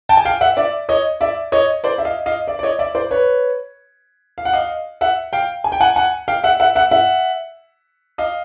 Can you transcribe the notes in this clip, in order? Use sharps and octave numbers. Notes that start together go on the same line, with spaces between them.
G5 A5
G#5
F5 G5
E5 F#5
D5 E5
C#5 D#5
D5 E5
C#5 D#5
C5 D5
E5
D#5 F5
D#5 F5
D5 E5
D5
C#5 D#5
D5 E5
C5 D5
B4 C#5
F5
F#5
D#5 F5
E5 F#5
F5 G5
G#5
G5
F#5 G#5
F#5 G#5
F5 G5
E5 F#5
E5 F#5
E5 F#5
E5 F#5
D#5 F5